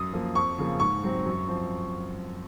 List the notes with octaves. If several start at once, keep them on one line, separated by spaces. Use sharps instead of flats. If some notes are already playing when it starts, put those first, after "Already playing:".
Already playing: F#2 D#6
F3 A#3
F2 C#6
C#3 F3 A#3
G#2 C#6
F#3 C4
F#2
F3 C4